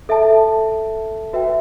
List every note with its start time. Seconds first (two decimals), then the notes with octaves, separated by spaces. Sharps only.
0.09 A4 E5 A5
1.33 F#4 B4 E5 G5